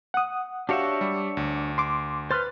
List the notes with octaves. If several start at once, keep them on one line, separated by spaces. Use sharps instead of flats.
F#5 D#6
D4 F#4 G4 C#5 E5 F5
G3
D2
C6 D6
B4 C5 C6 F6 F#6 A6